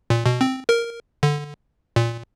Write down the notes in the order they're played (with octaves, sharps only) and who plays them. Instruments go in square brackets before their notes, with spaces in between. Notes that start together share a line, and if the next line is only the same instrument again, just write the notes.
[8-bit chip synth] A#2
B2
C4
A#4
D3
A#2